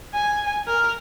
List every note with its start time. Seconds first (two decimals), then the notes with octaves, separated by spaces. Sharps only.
0.14 G#5
0.67 A#4